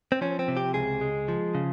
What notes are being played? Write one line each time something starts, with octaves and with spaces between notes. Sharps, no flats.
C4
F3 C#4
C4
C3
G4
C#2 G#4
G#3
F3
C#3